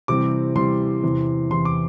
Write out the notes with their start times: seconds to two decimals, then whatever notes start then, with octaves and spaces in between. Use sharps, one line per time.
0.08 C3 E3 G3 C4 D6
0.55 C3 E3 G3 C4 C6
1.03 E2 C3 E3
1.50 E2 C3 E3 C6
1.65 D6